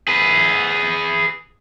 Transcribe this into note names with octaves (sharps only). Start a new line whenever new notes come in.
G#4 B4